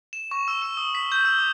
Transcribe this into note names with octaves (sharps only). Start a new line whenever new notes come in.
E7
C#6
E6
E6
D#6
B6
G6
E6
D6